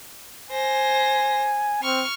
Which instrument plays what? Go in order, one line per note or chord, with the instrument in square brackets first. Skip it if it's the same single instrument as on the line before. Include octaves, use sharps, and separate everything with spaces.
[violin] C5 A#6 [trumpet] G#5
[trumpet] C4 [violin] C#6 F6